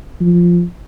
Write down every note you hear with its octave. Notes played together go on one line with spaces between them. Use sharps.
F3